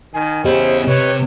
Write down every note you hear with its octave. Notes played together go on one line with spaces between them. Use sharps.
D#3 G#5
C#3 B3 E4 G4 C5 D#5
C3 B4 C#5